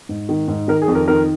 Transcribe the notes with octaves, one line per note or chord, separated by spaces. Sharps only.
G#2
D#3
G#2
D#3 A#4
G#4
F2
A#4
D#3 A#4